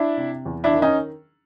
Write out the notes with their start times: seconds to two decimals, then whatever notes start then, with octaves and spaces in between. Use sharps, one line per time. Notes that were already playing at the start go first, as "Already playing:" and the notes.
Already playing: D4 E4
0.17 C3
0.46 E2
0.64 D4 E4
0.73 D#3
0.82 C#4 D#4